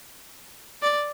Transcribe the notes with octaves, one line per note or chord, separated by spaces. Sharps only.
D5